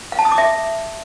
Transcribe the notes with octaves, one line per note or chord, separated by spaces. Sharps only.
F5
A5
D#6
D6
E5